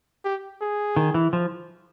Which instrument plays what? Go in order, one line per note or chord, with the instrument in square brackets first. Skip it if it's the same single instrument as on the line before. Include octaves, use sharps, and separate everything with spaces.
[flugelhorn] G4
G#4
[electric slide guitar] D#3
E3
F3